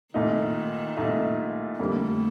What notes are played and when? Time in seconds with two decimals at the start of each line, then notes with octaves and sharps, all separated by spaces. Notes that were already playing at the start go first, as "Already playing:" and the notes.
0.14 C2 A#2 D#3 A3 D#4
0.97 C2 A#2 A3 D#4
1.79 F2 D3 G3 A3 A#3